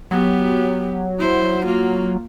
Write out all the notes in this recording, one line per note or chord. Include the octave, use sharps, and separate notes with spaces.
F#3 B3 G4
E4 C5
A#3 F4